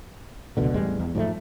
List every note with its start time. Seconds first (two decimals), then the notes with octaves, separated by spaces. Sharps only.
0.57 F1 C#2 B2 D3
0.74 A1 E2 G3 G#3
0.99 E2
1.15 G#2 F3 G3 A3